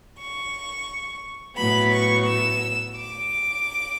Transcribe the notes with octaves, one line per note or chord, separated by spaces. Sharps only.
C#6
A2 F#3 B3 B5
C#6
E6
D6